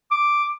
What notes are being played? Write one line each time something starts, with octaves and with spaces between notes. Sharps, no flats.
D6